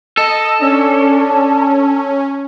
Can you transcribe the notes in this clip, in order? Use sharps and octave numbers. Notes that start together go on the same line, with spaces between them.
A4 D#5
C#4 D4